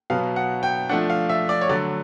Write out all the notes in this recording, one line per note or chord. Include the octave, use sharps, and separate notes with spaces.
B2 F#3 B3 F5
F#5
G5
F3 A3 D4 F#5
F5
E5
D5
C#5
D3 F#3 A3 D5